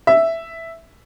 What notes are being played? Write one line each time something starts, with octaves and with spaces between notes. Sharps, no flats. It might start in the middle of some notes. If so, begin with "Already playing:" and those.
E5